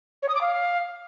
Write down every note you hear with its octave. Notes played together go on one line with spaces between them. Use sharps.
C#5
D#6
D6
F5